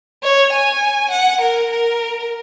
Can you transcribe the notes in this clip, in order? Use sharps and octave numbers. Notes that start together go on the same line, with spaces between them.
C#5
G#5
F#5
A#4
A#4